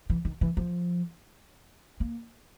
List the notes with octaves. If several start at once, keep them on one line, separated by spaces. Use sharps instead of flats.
E3
D#3
E3
F3
A#3